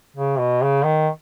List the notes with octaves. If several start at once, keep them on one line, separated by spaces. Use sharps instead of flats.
C#3
B2
C#3
D#3